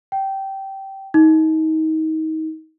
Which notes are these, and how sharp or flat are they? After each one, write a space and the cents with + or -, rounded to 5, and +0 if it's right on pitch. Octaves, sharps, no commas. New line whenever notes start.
G5 -15
D#4 +30